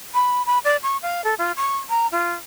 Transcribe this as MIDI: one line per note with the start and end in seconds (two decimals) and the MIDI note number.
0.14 0.45 83
0.46 0.59 83
0.64 0.76 74
0.83 0.97 85
1.02 1.24 77
1.24 1.34 69
1.38 1.52 65
1.57 1.77 85
1.89 2.07 82
2.12 2.33 65